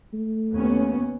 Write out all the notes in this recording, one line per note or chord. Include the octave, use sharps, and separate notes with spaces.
A3
D#2 B3 C#4